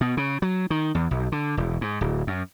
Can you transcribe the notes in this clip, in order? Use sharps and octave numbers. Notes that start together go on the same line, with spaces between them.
B2
C#3
F#3
D#3
E2
B1
D3
E1
G#2
D1
F#2